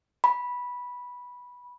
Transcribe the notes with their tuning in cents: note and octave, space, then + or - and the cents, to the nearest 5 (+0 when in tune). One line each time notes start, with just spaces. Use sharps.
B5 -10